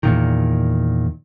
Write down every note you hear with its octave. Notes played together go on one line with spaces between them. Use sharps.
E2 A#2 D#3